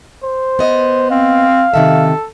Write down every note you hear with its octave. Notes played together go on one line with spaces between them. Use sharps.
C5
B3 D#5
C4 F5
C3 D#3 A4 E5